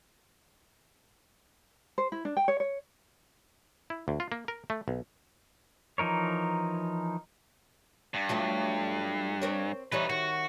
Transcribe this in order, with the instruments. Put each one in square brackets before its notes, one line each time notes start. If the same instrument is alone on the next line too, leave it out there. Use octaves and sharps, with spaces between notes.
[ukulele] C5
E4
D4
G5
C#5
C#5
[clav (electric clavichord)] E4
D2
F4
A#3
A#4
A3
B1
[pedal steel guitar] E3 F3 D#4 A#4 C#5
[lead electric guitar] G2
[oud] F3 F#3 A3
C4 A#4 C#5
[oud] E3 G3 C#5 [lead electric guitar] D#4 B4
[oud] D#3 [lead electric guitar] F#4